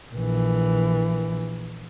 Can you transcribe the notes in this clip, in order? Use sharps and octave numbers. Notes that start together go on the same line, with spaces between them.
A#1 E3